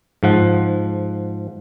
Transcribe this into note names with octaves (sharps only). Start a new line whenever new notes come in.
G#2 F3 F#5